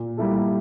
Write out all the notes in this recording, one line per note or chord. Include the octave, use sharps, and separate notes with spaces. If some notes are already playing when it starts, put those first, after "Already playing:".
Already playing: A#2
G3 A#3 E4 A4